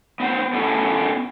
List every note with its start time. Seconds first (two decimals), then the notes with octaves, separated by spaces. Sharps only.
0.20 B3 C4 C5
0.53 A3 B3 C#4 D4 E4 A4